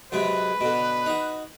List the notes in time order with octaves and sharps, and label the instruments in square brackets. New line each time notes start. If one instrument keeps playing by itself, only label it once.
[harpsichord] F#2 C3 G#3 [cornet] B4
[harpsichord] B2 D3
D#4 F#4